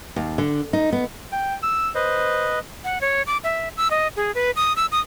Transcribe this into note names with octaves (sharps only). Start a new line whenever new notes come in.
D#2
D3
D#4
B3
G5
E6
B4 C5 D#5
F#5
C#5
D6
E5
E6
D#5
G#4
B4
D#6
E6
D#6